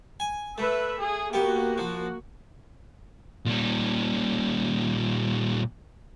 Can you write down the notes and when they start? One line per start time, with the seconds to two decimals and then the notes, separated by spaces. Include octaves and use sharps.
0.20 G#5
0.58 A3 B4 E5
1.00 G#4
1.33 A#3 B3 F#4 G4
1.78 F3
3.46 A#2 G3